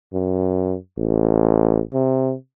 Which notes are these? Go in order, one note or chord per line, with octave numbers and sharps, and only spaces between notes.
F#2
A1
C3